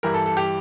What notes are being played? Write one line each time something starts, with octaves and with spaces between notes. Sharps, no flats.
G2 E3 G3 A#4
A4
A4
G4